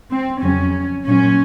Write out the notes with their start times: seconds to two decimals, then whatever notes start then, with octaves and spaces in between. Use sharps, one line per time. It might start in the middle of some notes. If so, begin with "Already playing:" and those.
0.10 C4
0.41 F2 C#3 F#3 C#4
1.05 A#2 F#3 C#4